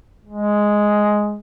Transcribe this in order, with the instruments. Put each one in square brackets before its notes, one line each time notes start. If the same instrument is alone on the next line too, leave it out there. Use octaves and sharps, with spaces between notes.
[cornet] G#3